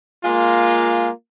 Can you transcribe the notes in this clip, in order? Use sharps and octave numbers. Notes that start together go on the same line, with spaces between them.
G#3 A#3 F4